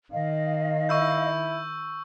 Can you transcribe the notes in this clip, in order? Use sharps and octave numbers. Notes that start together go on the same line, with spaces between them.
D#3 D#5 F5
E4 C#6 E6 G6